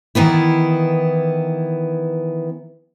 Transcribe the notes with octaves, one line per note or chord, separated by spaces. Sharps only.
D#3 E3 B3 E4